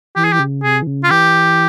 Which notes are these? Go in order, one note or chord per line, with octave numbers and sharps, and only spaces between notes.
E3 G4
G#4
E3 G4
C#3
C3 G#4
E3
C#3
F4
C#3
E3 G4